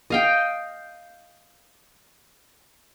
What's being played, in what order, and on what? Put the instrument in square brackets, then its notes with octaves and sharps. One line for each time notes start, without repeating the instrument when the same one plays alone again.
[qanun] D#5 F5 G5